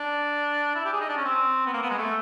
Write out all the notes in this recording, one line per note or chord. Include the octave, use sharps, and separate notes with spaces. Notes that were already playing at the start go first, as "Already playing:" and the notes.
Already playing: D4
E4
G4
G#4
D#4
D4
C#4
C4
B3
A#3
B3
G#3
A3